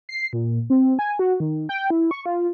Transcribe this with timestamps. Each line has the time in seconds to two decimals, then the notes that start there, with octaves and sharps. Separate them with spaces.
0.09 C7
0.33 A#2
0.70 C4
0.99 G#5
1.19 F#4
1.40 D#3
1.69 G5
1.90 E4
2.11 C#6
2.26 F4